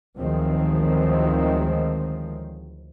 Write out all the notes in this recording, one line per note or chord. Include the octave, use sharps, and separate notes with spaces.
D2 D#3 F3 F#3 G#3 C4